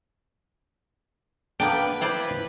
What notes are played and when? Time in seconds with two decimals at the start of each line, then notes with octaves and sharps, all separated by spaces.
1.60 A#3 B3 D4 B4 G5
2.01 E4 C5 D5